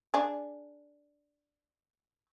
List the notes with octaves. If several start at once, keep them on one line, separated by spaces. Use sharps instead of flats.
D4 G#4